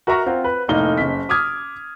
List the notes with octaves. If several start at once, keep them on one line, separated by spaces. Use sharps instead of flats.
F#4 A#4 E5 F#5 A#5 C#6
C4 F4 F#5
B4
F1 A2 A#3 D#4 G7
F#1 B6
D6 D#6 F6 G#6